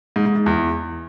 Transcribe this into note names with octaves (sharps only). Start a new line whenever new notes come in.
G#2
G#2
G#2
E2